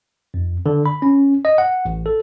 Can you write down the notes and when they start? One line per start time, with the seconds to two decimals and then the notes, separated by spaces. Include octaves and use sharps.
0.34 F2
0.66 D3
0.86 B5
1.02 C#4
1.45 D#5
1.58 F#5
1.85 A1
2.06 A4